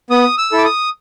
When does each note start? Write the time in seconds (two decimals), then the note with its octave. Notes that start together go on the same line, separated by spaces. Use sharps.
0.10 B3 D#6
0.38 E6
0.52 E4 A4
0.58 D6
0.65 D#6